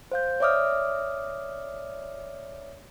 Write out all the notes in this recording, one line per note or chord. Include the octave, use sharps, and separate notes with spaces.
C5 F5 G6
C#5 D5 E5 D6 D#6 F6